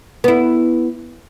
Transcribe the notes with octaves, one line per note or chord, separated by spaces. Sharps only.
B3 E4